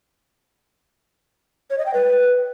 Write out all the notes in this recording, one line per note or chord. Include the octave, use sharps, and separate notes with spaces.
C#5
D#5
G5
B4